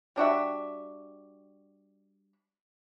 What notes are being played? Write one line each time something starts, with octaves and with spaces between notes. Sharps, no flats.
G3 D4 F#4 E5